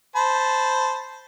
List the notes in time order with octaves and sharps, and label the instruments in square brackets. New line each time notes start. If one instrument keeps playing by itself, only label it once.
[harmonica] C5 A5 B5